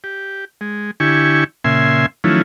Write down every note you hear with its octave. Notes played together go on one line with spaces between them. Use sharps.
G4
G#3
D3 E4 G4 G#5 C#6
A#2 C#3 E5 G#5 C6
D#3 F3 F#3 A3 C#4 E4